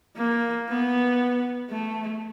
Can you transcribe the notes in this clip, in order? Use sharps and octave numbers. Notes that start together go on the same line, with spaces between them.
A#3
B3
A3